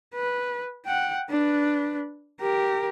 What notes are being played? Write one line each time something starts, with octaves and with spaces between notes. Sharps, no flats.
B4
F#5 G5
D4 B4
G4 A#4